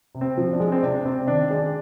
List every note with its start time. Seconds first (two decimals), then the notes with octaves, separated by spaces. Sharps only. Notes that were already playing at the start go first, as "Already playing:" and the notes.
0.15 C3
0.21 C4
0.38 F3
0.52 D4
0.60 G#3
0.72 C4
0.83 C3 D4
1.05 C3 C4
1.28 D#3 D4
1.50 G#3 D4